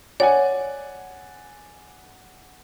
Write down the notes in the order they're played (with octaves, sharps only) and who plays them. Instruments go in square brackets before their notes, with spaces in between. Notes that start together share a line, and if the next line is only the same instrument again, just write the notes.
[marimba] C#5 [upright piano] D5 F#5 G#5